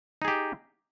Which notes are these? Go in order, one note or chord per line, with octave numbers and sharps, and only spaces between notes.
D#4 G4 G#4